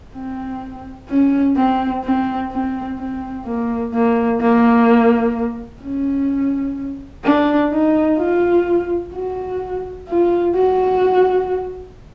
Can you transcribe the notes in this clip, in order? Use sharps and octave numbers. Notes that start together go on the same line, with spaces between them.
C4
C#4
C4
C4
C4
C4
A#3
A#3
A#3
C#4
D4
D#4
F4
F#4
F4
F#4